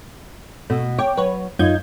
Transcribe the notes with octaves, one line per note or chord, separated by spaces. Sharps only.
B2 A3
C#5 G5 D6
F#3 B4 C#5
F#2 D#4 F4 G6 G#6